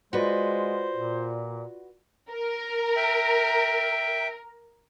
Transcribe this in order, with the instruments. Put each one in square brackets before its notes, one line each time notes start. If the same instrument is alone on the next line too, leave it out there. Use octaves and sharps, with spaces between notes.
[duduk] G#3 [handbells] F4 D5 F#5 [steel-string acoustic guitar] F#4 B4 [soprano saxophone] C5
[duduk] A#2
[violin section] A#4
[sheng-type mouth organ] E5 G5